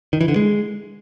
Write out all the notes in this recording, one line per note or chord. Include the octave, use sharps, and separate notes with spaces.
D#3
E3
D3
G#3